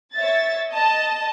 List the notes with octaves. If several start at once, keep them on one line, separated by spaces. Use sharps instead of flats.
C#5 E5 A6
D#5 A5